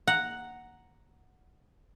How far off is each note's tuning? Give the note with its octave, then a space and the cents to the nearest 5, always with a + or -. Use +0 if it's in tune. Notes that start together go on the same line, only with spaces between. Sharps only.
F#5 +0 A#5 +0